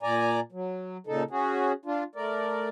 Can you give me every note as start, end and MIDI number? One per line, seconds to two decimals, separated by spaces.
0.03 0.40 46
0.03 0.40 74
0.03 0.40 80
0.03 0.40 82
0.52 0.97 54
1.07 1.23 46
1.07 1.23 49
1.07 1.23 63
1.07 1.23 69
1.31 1.72 61
1.31 1.72 66
1.31 1.72 68
1.86 2.04 62
1.86 2.04 65
2.15 2.69 57
2.15 2.69 70
2.15 2.69 74